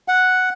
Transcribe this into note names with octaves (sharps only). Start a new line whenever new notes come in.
F#5